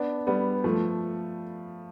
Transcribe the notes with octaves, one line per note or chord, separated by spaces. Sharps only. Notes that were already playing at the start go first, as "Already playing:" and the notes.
Already playing: B3 D4
G3 B3
F3 A3